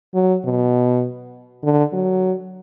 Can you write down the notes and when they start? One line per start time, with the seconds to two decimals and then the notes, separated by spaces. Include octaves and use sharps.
0.15 F#3
0.45 B2
1.63 D3
1.93 F#3